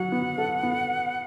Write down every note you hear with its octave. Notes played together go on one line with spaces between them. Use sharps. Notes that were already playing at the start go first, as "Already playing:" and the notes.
Already playing: F#3 F#5
B3
A4
B3